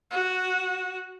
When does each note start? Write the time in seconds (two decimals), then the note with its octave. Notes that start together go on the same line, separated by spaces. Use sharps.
0.11 F#4